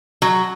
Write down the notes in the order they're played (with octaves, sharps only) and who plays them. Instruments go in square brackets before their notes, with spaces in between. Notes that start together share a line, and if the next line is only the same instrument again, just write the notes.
[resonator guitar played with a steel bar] F#3